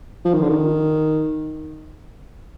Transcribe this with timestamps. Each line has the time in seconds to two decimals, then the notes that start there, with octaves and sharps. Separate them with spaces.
0.25 F3
0.34 D#3
0.42 D3
0.49 D#3